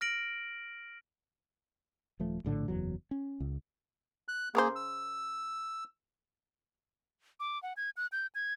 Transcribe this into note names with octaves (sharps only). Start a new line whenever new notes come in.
F6 A#6 D7 F#7
D#1 F3 A3
A#1 A2 D3 A3
F#1 E2 F#3
C#4
C#2
F#6
C#3 A#3 G#4 A#4 C5
E6
D6
F#5
G#6
F#6
G6
G#6